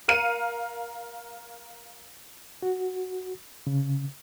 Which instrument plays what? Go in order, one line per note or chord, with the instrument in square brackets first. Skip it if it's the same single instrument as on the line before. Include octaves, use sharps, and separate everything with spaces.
[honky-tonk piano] A#4 F5 F6 C#7 D#7
[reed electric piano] F#4
C#3